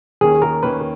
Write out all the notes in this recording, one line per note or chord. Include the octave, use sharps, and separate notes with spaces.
D#2 D#3 A#3 C#4 G#4
A#4
D#2 D#3 A#3 C#4 B4